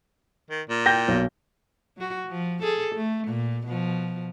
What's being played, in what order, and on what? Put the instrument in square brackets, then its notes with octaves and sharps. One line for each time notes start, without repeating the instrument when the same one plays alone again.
[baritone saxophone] D#3
A#2
[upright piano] G5 G6 A#6
B1
[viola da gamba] F#3 F#4
F3
G#4 A4
A3
A#2
B2 F3